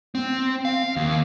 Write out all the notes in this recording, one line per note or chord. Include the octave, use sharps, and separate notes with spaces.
C4
F5
D#2